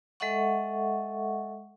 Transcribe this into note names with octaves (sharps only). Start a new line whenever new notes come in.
G#3 A4 D#5 E5 F#5 C#6